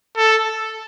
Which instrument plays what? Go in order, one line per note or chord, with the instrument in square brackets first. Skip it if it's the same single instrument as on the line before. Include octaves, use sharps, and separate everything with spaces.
[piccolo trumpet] A4